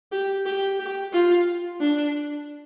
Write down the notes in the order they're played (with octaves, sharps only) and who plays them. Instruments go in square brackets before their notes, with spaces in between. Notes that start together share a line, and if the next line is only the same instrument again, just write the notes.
[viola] G4
G4
G4
F4
D4